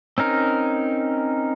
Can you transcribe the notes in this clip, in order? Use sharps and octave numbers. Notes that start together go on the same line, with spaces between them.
C4 C#4 D#4 A#4